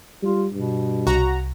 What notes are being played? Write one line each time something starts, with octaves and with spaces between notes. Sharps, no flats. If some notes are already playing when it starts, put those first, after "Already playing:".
G3 F4
G2 B2
C2 F#4 A#5